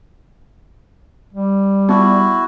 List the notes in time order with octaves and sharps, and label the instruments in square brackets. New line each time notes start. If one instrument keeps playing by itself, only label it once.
[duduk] G3
[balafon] B3 [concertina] E4 F#4